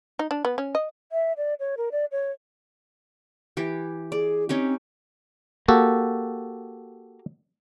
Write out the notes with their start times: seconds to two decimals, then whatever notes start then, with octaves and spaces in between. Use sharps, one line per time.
0.19 D#4
0.31 D4
0.45 B3
0.58 C#4
0.75 D#5
1.12 E5
1.37 D5
1.60 C#5
1.77 A#4
1.92 D5
2.12 C#5
3.57 E3 G4
4.12 G#4 D5
4.49 C4 C#4 D#4 G4
5.68 A#3 F#4 G4 A4